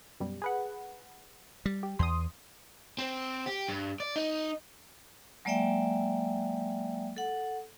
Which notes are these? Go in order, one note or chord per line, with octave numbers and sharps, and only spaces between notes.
F#2 B2 G3
G#4 B4 F#5
G3
G4
E2 C6 D#6
C4
G4
G2
D5
D#4
F#3 G#3 A#3 D5 E5 G5
A4 F#5